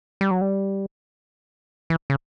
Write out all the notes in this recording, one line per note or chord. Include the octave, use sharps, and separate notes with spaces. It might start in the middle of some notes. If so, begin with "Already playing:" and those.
G3
F#3
G3
E3
C#3